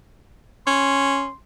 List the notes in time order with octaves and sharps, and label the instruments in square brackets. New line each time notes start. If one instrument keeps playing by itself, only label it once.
[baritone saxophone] C#4 [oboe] C6